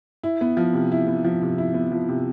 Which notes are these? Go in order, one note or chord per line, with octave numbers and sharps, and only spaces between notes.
E4
B3
F3
C3
E4
B3
F3
C3
E4
B3
F3
C3